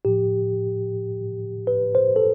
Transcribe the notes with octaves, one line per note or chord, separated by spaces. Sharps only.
A2 F3 G4
B4
C5
A4